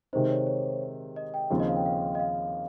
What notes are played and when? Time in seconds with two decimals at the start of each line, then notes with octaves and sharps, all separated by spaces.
0.13 C3 D#3 G#3 D#4 C5
0.30 C#5
0.47 C#5
1.16 D#5
1.34 G5
1.50 D#2 C#3 F3 C4 F4
1.60 D#5
1.68 F5
1.76 G5
1.86 F5
2.15 D#5
2.19 F5